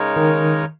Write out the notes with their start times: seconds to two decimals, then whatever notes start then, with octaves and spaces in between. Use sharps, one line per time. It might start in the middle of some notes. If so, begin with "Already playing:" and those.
Already playing: C#3 G#3 D#4 A#4 C#5
0.16 D#3